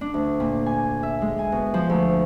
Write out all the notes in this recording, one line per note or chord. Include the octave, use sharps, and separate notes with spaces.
D4
D2
A#2
G#5
E5
G#3
G#5
B2
F3
D2